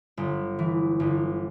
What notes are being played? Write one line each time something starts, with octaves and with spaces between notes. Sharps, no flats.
G1
E3
G1